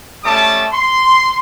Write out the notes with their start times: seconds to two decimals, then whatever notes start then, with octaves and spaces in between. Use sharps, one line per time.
0.24 G3 A3 C#4 A5 D6 D#6
0.72 C6